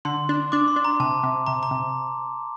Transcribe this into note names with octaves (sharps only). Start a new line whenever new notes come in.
D3 C6
D4
D4 D6
C6
D4
A#5
C3 A5
C3
C3 A#5
A#5
C3